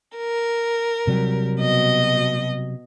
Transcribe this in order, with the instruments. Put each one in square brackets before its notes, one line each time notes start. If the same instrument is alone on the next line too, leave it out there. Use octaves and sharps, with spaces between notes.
[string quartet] A#4
[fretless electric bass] C3 F#3 G3
[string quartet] B2 D#5